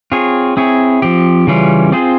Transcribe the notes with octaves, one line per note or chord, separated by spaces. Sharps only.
C4 F4 G#4 C#5
C4 E4 G#4 C#5
F3 C4 G4
C#3 E3 G3 C#4 F4
C4 F4 G#4 C5